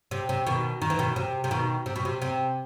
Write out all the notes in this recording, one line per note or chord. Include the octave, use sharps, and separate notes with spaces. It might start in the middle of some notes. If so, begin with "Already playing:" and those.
C3
C3
B2 D#3
D#3
E3
B2 D#3
C3
C3
B2 D#3
C3
B2
C3
C3